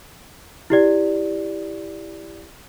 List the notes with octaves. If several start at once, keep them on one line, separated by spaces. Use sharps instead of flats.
E4 G4 D5